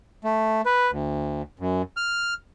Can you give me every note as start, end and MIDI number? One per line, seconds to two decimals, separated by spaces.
0.24 0.61 57
0.66 0.91 71
0.91 1.42 38
1.59 1.82 42
1.97 2.34 89